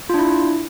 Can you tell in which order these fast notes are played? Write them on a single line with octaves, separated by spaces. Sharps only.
F4 D4 E4